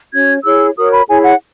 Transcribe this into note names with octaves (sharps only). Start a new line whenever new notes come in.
C#4 F#4 C#5 G#6
E4 G#4 C#5 E6
F#4 A#4 C#5 D#6
B5
E4 G#4 C#5 G#5
F#5